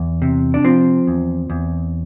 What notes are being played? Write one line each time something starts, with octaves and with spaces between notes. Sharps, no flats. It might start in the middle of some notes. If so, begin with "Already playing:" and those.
Already playing: E2
C3
D4
F3 C4
E2
E2